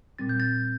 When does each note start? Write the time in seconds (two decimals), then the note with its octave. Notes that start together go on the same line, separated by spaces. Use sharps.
0.19 A#2 G3 C4 A6
0.29 G6
0.40 A6